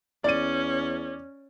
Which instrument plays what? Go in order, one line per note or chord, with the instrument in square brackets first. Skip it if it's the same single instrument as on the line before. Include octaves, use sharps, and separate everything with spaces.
[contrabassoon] E2 [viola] C#4 [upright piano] D5 D#7